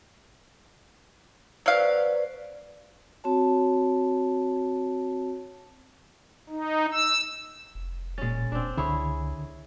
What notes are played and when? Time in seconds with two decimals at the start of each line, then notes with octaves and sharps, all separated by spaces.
1.66 F#3 B4 C5 D5 F5
3.24 C4 F#4 C#5 A5
6.50 D#4
6.92 E6
7.75 F1
8.18 A#2 G#3 C#4 A6
8.52 E1 C4 D4
8.77 C#2 D3 E4 G#4 C#5